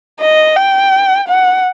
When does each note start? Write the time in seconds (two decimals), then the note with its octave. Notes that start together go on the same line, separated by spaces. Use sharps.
0.21 D#5
0.56 G5
1.29 F#5